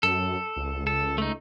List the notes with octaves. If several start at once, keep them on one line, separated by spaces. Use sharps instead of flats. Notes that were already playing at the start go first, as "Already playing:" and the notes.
F#2 A4
C#2
A4
A3 D#4